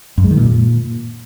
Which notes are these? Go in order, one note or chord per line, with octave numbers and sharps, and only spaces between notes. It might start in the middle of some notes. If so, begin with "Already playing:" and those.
F#2
G#3
D#3
A#2